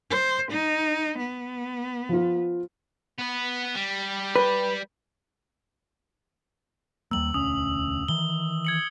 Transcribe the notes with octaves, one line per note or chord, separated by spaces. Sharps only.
C5
D#4
B3
F3 F4
B3 B4
G3
B4
D#2 G3 A#3 E6 F#7
E1 D2 C#4 D#6
D#3 E3 G7
G#6 C#7 F#7